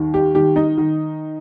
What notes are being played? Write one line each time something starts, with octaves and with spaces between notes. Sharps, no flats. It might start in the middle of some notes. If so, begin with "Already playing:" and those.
Already playing: D#2 D#3
G4
D#3 G4
D#4
D#3